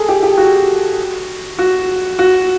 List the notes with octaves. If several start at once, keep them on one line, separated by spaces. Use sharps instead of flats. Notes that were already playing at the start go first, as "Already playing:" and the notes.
Already playing: G#4 A4
G4
G4
F#4
F#4
F#4